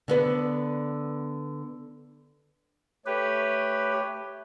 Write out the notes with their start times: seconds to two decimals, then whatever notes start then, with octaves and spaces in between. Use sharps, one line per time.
0.08 D3 B3 B4
3.06 A3 G4 B4 C#5